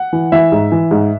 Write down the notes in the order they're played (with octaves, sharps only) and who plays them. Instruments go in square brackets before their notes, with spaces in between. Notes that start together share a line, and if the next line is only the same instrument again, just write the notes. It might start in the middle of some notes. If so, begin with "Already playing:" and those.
Already playing: [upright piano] F#5
E3
E3 E5
G#2
E3
G#2